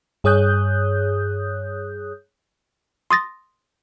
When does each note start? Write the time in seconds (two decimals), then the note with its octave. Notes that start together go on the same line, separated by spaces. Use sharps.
0.24 G2 G#4 C#5 D#6 F#6 G6
3.11 C6 D#6 A6 A#6